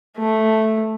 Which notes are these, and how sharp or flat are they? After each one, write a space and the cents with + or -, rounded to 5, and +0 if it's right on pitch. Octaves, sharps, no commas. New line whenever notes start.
A3 -5